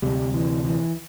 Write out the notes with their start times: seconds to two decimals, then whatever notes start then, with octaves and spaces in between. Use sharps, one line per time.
0.02 D2 C3 G3
0.34 E3
0.64 E3